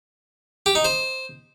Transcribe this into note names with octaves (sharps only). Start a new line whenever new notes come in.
G4
D#4
C5